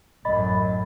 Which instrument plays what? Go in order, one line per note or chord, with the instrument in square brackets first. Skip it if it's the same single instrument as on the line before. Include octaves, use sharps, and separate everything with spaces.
[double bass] A1 F#2 [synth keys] D#5 B5 A6